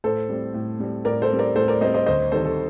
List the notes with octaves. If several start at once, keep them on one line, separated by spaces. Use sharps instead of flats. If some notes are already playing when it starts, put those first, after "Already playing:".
A2 A4 C5
G3 C4
A2
G3 C4
A2 A#4 D5
A4 C5
G3 C4
A#4 D5
A2 A4 C5
A#4 D5
G3 C4 C5 D#5
C5 D#5
D2 C5 D#5
C3 D#3 G3 A4 C5
A4